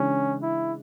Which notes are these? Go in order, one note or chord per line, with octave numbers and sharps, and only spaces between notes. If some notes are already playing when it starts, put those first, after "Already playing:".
Already playing: C#3 E3 G#3 C#4 D4
E4